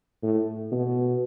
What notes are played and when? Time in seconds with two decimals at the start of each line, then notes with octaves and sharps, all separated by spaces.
0.23 A2
0.72 B2